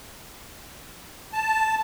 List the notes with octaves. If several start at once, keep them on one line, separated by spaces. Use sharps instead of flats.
A5